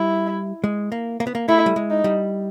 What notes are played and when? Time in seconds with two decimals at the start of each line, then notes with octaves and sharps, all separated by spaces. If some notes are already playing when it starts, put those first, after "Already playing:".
Already playing: G3 E4
0.64 G#3
0.92 A#3
1.20 A#3
1.27 B3
1.35 A#3
1.48 A3 E4
1.66 G3
1.76 G#3
1.90 D#4
2.04 G3